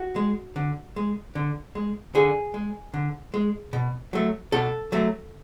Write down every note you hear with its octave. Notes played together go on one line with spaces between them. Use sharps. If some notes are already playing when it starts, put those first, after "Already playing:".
Already playing: F#4
G#3
D3
G#3
D3
G#3
D3 G#4
G#3
D3
G#3
B2
F#3 A3
B2 A4
F#3 A3